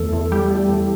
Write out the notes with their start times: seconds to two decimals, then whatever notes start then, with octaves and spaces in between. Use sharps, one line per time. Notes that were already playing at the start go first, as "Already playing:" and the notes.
Already playing: E2 E3 A3 A4
0.13 E2
0.32 G3 G4
0.51 G3
0.69 E2